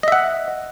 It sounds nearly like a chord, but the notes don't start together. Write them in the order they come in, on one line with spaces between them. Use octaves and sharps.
D#5 E5 F#5